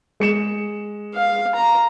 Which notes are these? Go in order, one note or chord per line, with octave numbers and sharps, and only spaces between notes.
G#3 C#7 E7
F5
A#5